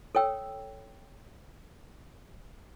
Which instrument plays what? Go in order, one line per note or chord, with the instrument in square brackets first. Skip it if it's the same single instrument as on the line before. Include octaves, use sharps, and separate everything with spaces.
[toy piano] A4 C#5 G5 E6